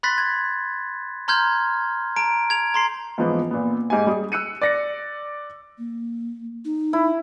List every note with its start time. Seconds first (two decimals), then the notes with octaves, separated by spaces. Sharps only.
0.03 B5 C6 F#6 A6 B6
0.18 G#6
1.28 A#5 C6 F6 G6 G#6
2.16 A5 A#5 D7
2.50 G#6 F7
2.74 A#5 C6 C7
3.18 G#2 E3 F3 B3
3.51 A#2 B3
3.90 G#2 G4 G#5
4.07 G3 G#4
4.32 E6 F#6 C#7 D#7
4.61 D5 A#6 C#7
5.78 A#3
6.65 D#4
6.93 E4